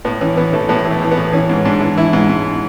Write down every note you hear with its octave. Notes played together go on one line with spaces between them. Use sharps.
A2 B3
E3 C#4
E3 B3
E3 A3
A2 B3
E3
A3
E3
B3
A2
E3 C#4
G#2
G#2 D4
E3
E3 E4
G#2
G#2